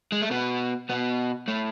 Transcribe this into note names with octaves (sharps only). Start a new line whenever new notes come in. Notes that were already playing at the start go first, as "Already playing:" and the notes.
G#3
A3
B2 B3
B2 B3
A2 A3